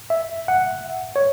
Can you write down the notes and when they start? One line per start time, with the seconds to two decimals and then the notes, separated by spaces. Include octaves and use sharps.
0.10 E5
0.48 F#5
1.16 C#5